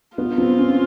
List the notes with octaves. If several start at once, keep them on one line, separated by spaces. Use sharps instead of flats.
B3 F4
C4
C#4